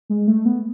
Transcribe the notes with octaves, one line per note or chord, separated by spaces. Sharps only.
G#3
A3
B3